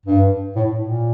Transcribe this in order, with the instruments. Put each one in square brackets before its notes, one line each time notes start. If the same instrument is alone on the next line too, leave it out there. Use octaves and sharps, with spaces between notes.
[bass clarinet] G2
A2
A#2